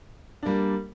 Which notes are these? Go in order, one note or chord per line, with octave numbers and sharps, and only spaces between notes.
G3 A#3 D4